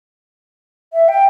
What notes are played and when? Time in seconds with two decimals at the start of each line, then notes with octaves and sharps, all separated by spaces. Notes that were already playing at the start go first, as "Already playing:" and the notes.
0.93 E5
1.08 G5